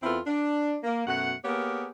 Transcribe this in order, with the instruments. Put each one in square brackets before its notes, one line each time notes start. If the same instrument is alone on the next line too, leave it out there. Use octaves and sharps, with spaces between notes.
[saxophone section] E2 C4 E4 F4 A4 B4
D4
A#3
F#2 B2 A3 F#5
A#3 B3 G4 G#4 A#4 C#5